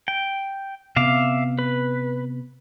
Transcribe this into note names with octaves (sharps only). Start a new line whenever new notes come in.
G5
C3 B3 E5 F5 D6
B4